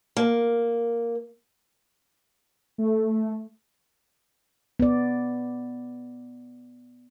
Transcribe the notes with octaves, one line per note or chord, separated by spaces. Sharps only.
A#3
A3
B3 D5